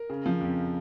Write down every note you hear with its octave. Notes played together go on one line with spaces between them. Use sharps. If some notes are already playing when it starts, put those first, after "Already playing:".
Already playing: A#4
C#3
F3
F2